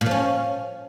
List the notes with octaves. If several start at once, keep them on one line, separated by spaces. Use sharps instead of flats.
A#2
F3
C#4